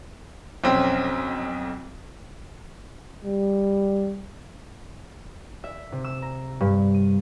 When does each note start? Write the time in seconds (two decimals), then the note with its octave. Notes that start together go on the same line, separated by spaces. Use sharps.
0.64 B1 F2 C4 C#4
3.24 G3
5.64 E5
5.92 C3
6.04 E6
6.22 A#5
6.61 G2
6.94 D#7